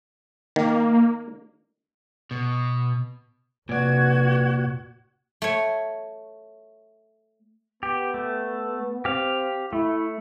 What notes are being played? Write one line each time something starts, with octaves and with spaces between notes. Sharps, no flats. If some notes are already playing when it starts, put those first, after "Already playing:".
D#3 A#3
B2
F1 A#2 F#4 B4 D5 G#6
A3 C#5
B3 G4
A3
C4 G4 F5
A3 E4